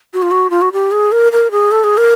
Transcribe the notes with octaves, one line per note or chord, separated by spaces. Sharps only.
F#4
F4
F#4
F4
F#4
G4
G#4
A#4
A#4
G#4
A4
G#4
A#4